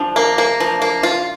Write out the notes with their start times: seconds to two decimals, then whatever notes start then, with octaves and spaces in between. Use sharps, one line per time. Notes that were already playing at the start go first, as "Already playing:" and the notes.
Already playing: F3 D4
0.16 A#3
0.38 A#3
0.60 F3
0.82 A#3
1.03 F4